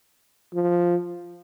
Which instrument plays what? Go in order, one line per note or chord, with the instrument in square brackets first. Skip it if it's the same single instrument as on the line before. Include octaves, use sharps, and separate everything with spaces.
[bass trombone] F3